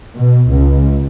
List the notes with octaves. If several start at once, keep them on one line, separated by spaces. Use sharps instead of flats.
B2
C#2